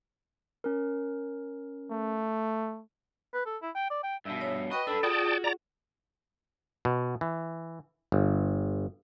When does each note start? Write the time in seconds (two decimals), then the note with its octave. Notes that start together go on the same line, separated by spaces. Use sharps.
0.64 C#4 A#4
1.90 A3
3.33 B4
3.46 A4
3.62 E4
3.75 G5
3.90 D5
4.03 G5
4.25 G2 B2 E5
4.41 C#5
4.72 F#4 B4 D#5 G5 B5
4.87 D4 A4 B4 B5 E6
5.03 F4 F#4 G#4 D5 G5 A5 D#6
5.44 D5 A#5
6.85 B2
7.21 E3
8.12 G1